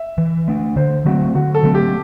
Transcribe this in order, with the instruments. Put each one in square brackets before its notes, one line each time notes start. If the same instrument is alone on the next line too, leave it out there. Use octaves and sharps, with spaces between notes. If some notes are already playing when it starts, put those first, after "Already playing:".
Already playing: [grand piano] E5
[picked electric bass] E3
A3 D4
[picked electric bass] D3 [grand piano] C5
[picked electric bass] F#3 A3 C4 [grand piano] F#4
[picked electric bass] D3 [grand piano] F#4
[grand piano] A4
[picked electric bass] F#3 A3 C4
[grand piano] G4